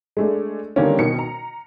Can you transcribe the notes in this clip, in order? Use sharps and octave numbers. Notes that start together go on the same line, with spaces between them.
G#3 A3 D4
D3 D#3 G3 A#3 C4 C#4
B2 D#3 C#7
A#5